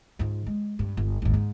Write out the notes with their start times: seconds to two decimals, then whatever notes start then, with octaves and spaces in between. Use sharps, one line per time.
0.19 G#2 F3
0.47 G#3
0.79 G2
0.97 G1
1.22 G#1 D#2
1.34 G#2